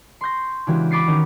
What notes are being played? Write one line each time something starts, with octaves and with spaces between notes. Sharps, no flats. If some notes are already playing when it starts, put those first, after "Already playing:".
C6 C#6 G6 A#6
C#3 E3 G#3 D4 F#4 G4
B5 C#6 D6 A6 C7 C#7
D#3 C#4 D#4